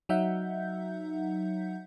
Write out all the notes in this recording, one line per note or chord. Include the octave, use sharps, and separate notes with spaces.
F#3 D#4 E5 F#5 G6